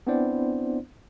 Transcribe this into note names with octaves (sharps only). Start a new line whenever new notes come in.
B3 C4 D4 E4 C5 D5